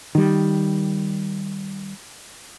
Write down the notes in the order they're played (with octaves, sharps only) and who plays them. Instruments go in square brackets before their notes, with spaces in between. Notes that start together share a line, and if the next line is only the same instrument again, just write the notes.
[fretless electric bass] D#3 G3